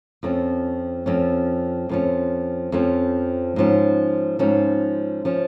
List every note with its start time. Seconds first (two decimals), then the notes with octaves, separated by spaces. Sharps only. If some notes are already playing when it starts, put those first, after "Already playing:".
0.23 F2 F3 C#4
1.06 F2 F3 C#4
1.89 F2 F3 C#4
2.72 F2 F3 C#4
3.56 G#2 F3 C#4
4.39 G#2 F3 C#4
5.25 F3 C#4